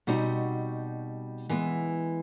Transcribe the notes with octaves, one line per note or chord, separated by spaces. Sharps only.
B2 G3 C4 D#4 F#4
E3 G#3 B3